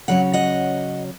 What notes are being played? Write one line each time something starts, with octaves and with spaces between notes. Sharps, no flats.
C#3 F#3 C#4 F#5
D#5 F#5